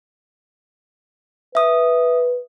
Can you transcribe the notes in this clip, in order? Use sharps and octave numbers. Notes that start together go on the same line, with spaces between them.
B4 E5 D#6